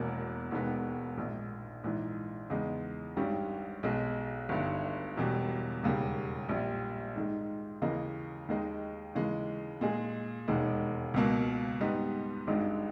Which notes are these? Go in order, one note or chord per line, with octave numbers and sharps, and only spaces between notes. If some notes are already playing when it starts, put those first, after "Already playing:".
Already playing: E1 E2 B2 A#3
E1 D#2 D#3 G#3 B3
A#1 G#2 D#3
A#1 G#2 E3
E2 C#3 G#3 D#4
G#1 G2 D#3 G3 C#4
B1 B2 G#3
G1 G2 D#3
E1 E2 B2 G3
E1 D#2 C#3 G3
A#1 A#2 G3
G#2 D#3 G#3
D#2 C#3 E3 A#3 D#4
D#2 D#3 G#3 D#4
D#2 C#3 E3 G#3
A#2 G#3 D#4 G#4
E1 D#2 D#3 G#3
C#2 B2 A#3
G#2 G3 B3 D#4
G#1 G2 D#3 G#3 D#4